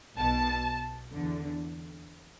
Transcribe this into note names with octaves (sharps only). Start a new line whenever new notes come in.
B1 B2 A5
D3
E2